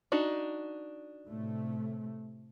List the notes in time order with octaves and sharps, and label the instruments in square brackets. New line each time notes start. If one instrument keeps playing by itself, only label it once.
[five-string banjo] D4 D#4 F#4
[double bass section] A2 C3 A3